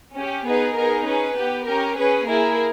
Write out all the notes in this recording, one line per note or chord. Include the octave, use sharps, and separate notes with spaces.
C#4 G4
B3 D#4 G#4 B4
B3 D#4 G#4 A#4
C#4 G#4 B4
B3 G4
C#4 G4 A#4
C#4 G#4 B4
A#3 E4 G#4 A#4